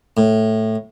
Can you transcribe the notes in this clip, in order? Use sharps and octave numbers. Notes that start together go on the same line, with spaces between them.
A2